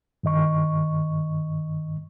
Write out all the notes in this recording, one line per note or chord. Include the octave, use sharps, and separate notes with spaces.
G2 D#3 D#5 C#6